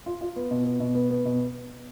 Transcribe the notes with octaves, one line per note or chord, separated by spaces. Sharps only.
F4
F4
B3
B2
B3
B2
B3
B3
B2